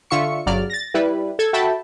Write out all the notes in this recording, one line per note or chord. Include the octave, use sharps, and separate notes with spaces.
D3 F4 E5 C#6 C#7
G1 C#3 F#3 D5 F6
A6 A#6
G3 E4 B4
A4 G#6
F#4 A4 E5 G5 A5 B5